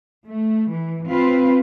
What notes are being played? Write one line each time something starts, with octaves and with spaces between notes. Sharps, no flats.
A3
E3
C4 F4 B4